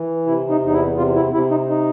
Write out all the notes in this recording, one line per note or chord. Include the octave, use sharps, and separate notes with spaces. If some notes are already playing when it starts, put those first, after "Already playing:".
Already playing: E3
C3 E4
D#4
E2 D#4
E4
C3 F4
E4
C3 E4
D#4
D#4